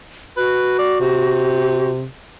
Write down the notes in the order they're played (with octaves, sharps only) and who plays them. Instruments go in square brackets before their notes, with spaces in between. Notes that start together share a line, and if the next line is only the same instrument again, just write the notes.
[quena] F#4 [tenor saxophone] B4
[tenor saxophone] D5
C3